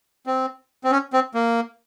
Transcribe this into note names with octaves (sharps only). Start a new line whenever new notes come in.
C4
C4
C#4
C4
A#3